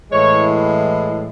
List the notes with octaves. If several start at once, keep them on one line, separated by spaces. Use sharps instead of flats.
A2 E3 G#3 C#5